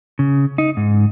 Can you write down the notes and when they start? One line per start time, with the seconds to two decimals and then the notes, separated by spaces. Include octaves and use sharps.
0.19 C#3
0.58 D#4
0.77 G#2